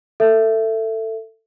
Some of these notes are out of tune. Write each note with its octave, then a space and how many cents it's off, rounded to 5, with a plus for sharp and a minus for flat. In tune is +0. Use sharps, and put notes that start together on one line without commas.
A4 +20 E5 +10